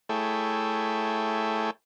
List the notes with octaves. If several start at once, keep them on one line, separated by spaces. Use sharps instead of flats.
A3 E4 G#4 A4 C#5 G5